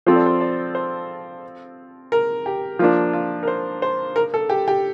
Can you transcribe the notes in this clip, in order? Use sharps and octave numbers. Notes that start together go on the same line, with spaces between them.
F3 C4 F4 A4 C5
D5
C5
D5
C5
A#4
G4
F3 A#3 D4 F4
F4
A#4
C5
C5
A#4
A4
G4
G4